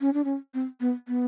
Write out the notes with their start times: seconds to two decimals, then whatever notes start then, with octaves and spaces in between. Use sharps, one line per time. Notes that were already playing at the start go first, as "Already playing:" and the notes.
0.01 C#4
0.14 D4
0.25 C#4
0.54 C4
0.80 B3
1.08 B3